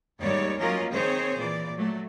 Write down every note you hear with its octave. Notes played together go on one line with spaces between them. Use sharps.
D#2 G#2 D#3 G3 C#5 D5
F#3 A#3 C#4 F4 A#4 D#5
D#3 C4 G#4 C5 C#5
A#2 E3 D5
F#3 A3